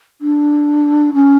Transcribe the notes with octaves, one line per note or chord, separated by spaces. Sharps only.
D4
C#4